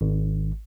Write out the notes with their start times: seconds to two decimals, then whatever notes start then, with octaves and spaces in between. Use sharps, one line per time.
0.01 G#1